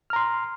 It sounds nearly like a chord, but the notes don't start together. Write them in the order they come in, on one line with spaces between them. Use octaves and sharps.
F6 A#5 C6